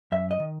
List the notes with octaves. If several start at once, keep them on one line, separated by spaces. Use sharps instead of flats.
F#2 E5
D#5
D#3